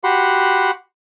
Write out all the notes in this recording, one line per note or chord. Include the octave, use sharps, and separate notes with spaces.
F#4 G4 F#5 B5 C6